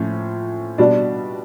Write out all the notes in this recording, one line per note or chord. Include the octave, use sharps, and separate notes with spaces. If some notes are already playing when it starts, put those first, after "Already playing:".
Already playing: A2 F3 C#4
B2 G3 D4